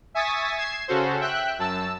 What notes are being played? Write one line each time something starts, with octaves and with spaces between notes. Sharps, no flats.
E5 G#5 C#6 D#6 A6 B6
G#6 C7 E7
C#3 C#4 F#4 A4 C5
E5 G5 F#6
F#2 A5 E6